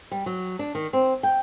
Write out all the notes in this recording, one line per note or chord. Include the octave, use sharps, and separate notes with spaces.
G3
F#3
D4
D#3
C4
G5